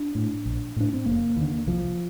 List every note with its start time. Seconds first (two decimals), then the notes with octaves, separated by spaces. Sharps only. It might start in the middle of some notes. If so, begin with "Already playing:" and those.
Already playing: D4
0.15 A2
0.46 A#1
0.76 A2 D4
0.94 C4
1.06 F1 A#3
1.36 D#2 D3
1.67 C2 F3